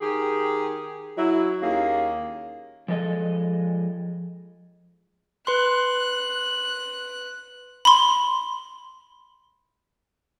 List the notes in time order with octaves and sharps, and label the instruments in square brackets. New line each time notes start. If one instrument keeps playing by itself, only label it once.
[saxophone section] D#3 G4 G#4
F#3 E4
D#2 A#3 C#4 G#4
[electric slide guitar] F3 G#3 A4 D#5
[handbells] B4 C6 [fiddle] F#6
[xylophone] B5 C6